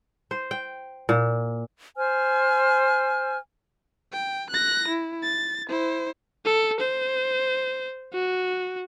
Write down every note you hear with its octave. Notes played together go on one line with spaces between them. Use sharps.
C5
G5
A#2
C5 G#5 F6
G5
F#6 A#6
E4
A6
E4 C5
A4
C5
F#4